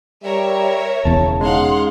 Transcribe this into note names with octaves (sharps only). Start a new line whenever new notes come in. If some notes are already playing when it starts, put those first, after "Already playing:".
G3 A#4 C#5 E5
E1 E2 C#3 A5
G#3 C#4 D#4 F5 F#5 C6